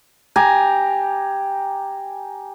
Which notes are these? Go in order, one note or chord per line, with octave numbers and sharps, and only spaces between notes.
G4 G#5 A#5